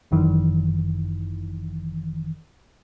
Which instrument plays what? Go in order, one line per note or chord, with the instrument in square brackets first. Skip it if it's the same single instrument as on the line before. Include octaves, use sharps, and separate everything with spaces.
[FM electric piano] G1 F#2 D#3 E3